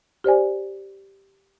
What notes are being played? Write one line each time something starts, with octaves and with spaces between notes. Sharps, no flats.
G4 C5 D5 G#5